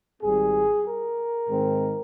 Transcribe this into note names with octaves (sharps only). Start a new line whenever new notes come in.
G#1 G#2 G3 C4 G#4
A#4
G#2 D#3 G#3 C4